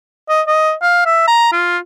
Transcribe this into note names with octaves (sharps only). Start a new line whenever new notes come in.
D#5
D#5
F5
E5
A#5
F4